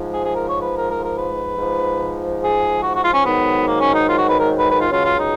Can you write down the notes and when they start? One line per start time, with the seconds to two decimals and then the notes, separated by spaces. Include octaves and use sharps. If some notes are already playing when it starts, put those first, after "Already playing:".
Already playing: G#2 F3
0.12 G#4
0.23 G#4
0.33 A#4
0.47 C#5
0.61 B4
0.75 A#4
0.89 A#4
1.02 A#4
1.17 B4
1.58 G#2 F3
2.41 G#4
2.82 F#4
2.93 F#4
3.03 F4
3.13 C#4
3.24 G#2 D#3 F#3 B3
3.66 A#3
3.79 C#4
3.93 D#4
4.07 F4
4.17 F#4
4.27 B4
4.38 A#4
4.58 B4
4.69 B4
4.79 F4
4.90 C#2 C#3 F#3 F4
5.04 F4
5.18 D#4